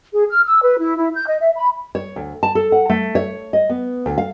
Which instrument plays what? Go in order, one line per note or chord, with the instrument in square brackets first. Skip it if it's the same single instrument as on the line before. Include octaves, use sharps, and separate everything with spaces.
[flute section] G#4
F6
E6
B4
E4
E4
G6
D#5
E5
B5
[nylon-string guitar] C#5
D2
A5
A4
F#5
A3
C#5
D#5
B3
D2
F5